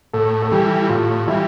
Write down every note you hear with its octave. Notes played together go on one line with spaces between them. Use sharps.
A2 A4
A4
E3 G3 G4
A2 F4
E3 G3 E4